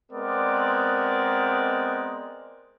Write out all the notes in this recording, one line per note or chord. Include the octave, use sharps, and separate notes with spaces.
G#3 B3 C4 A#4 D5